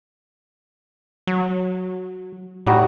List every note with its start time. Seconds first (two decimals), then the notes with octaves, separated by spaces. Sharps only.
1.27 F#3
2.66 A2 G3 D#4 F#4